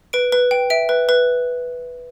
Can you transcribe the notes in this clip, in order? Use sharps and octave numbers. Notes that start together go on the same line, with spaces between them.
B4 D7
B4
G5
E5 D7
B4
B4